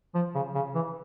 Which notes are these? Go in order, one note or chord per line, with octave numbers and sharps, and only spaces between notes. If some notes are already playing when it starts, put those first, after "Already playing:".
F3
C#3
C#3
E3